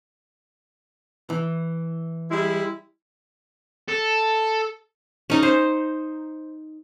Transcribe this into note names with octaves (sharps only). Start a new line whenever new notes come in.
E3
G3 G#3 E4
A4
C#4 D#4 A#5
C5